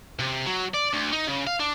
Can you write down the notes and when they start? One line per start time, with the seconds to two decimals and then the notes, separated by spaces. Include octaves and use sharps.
0.19 C3
0.46 F#3
0.74 D5
0.93 D2
1.13 D#4
1.27 C#3
1.47 F5
1.60 D4